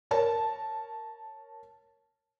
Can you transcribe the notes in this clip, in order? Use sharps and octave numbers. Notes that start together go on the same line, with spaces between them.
A#4 C#5 A5